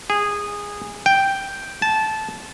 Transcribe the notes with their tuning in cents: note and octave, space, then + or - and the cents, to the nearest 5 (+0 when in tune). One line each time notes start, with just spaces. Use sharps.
G#4 -15
G5 +0
A5 -15